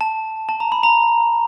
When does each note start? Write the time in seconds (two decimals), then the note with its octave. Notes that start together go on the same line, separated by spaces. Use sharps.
0.01 A5
0.49 A5
0.60 A#5
0.72 B5
0.83 A#5